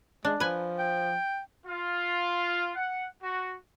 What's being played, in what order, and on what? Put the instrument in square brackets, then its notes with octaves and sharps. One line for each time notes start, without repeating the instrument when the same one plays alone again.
[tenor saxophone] G#3 [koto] D4
[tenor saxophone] F3 [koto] B4 G#5
[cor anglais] G5
[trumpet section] F4
F#5
F#4